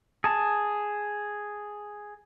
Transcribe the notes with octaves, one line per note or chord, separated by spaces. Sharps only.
G#4 A5